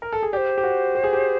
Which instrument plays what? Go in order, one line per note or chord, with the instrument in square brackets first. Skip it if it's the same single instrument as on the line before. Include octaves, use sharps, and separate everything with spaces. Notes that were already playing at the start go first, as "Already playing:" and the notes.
[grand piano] A#4
A4
G#4
[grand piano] G4 [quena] C5 D5
[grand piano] G4
F#4
G4
G#4
G4